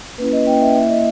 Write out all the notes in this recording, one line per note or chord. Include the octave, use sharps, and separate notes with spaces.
A#3 C#4 E4 B4
D#5
A#3 C#4 E4 G5
E5
A#3 E4 E5
D#5